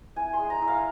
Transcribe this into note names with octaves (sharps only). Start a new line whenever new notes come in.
E4 G#5
C6
G#3
A#5
E4
F5